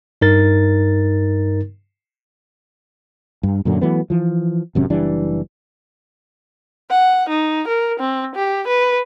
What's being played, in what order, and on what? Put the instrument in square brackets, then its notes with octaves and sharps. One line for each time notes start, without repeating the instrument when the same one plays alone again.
[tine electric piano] G2 D#4 A#4 A6
[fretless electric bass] G2
F#2 A#2 D3 F#3
E3 F#3 A3 B3
E3 F3
G#1 F#2 C3 C#4
F#1 E3 G3 D4
[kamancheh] F#5
D#4
A#4
C4
G4
B4